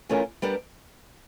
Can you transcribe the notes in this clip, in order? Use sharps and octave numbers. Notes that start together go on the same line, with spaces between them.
E3 A3 C#4 F4 A#4
G3 B3 D4 G4 A#4